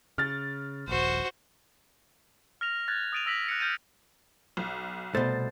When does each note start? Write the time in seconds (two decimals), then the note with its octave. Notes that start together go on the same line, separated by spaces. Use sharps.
0.18 C#3 F6 A6
0.88 D#1 A#1 F#4 C5
2.61 F6 A#6 F7
2.88 F#6 G#6 A6
3.12 D#6 A6 D7 D#7 F7
3.26 E6 A#6 B6 F#7
3.48 F#6 A#6 C#7
3.60 F6 G6 A6 D#7
4.57 B1
5.15 C2 B2 A3 C5 A6